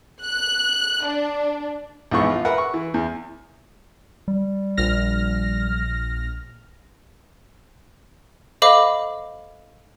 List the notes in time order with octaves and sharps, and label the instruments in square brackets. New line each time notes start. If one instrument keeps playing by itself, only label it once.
[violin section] F#6
D4
[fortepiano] A#1 G#2 E3 B3 C#6
F4
A#4 B4 E5 F#5
C#6
E3
E2
[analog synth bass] G3
[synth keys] A#1 F6 A#6
[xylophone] A4 C5 D#5 F5 B5 D6